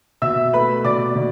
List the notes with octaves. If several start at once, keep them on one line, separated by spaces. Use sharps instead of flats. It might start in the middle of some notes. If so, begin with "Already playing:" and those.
B2 E5 E6
A3 B4 B5
B2 D5 D6
B2